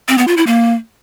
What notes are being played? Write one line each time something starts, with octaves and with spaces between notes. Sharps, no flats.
C4
B3
F4
E4
A#3